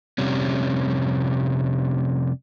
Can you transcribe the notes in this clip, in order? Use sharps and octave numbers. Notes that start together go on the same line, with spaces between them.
F2 C3 G3 C#4